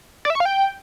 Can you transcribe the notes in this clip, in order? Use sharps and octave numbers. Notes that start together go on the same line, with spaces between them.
D5
E5
C#6
F5
G5